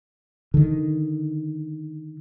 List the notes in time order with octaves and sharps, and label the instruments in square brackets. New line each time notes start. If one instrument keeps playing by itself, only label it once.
[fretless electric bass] D3 D#3